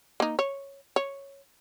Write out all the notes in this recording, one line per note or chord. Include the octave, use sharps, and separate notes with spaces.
A#3 D#4
C#5
C#5